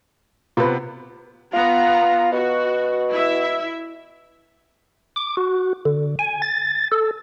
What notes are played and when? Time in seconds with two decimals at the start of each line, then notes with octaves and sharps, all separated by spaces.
0.57 C3 B3 F4 B4
1.54 B3 F4 A#5
2.32 B2 F#4
3.10 E4 E5
5.16 D6
5.37 F#4
5.85 D3
6.19 G#5
6.42 A6
6.92 A4